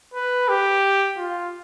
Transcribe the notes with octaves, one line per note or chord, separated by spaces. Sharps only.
B4
G4
F4